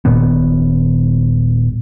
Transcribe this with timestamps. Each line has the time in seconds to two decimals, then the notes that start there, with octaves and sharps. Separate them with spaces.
0.05 D#1 A#2 D#3 B3